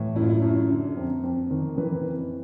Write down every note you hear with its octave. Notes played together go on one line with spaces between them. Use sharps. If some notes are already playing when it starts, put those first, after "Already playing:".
Already playing: A2 E3
F#2 E4
F4
E4
F#2
D3
F2
F2
D#3
E3 B4
F2